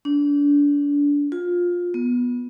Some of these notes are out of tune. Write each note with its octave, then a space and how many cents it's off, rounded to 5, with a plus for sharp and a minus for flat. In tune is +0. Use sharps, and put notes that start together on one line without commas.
D4 -30
F4 +15
B3 -15